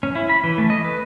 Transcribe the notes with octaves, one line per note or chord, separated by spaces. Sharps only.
C#4
E4
B5
E3
A3
D#5
B4